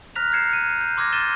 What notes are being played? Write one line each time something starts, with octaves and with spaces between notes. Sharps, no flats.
A#5 F6 F#6 A#6 B6 F7
F6 G6 G#6 C7 C#7 E7
D#7
G6
C6 D6 E6 F6 G#6 A#6
G6 A6 D#7 E7 G7